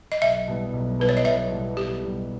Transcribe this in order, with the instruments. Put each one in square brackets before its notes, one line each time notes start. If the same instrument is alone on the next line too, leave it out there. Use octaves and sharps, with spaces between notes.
[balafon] D#5
[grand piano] B1 [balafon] E5
[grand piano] B2 G3 B3 E4
B1
[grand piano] B2 G3 B3 E4 [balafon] B4
[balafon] C#5
D#5
[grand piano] B1 [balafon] E5
[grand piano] B2 G3 B3 E4
[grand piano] B1 [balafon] G4
[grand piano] B2 G3 B3 E4